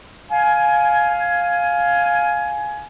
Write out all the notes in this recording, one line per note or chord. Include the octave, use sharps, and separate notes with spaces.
F5 G#5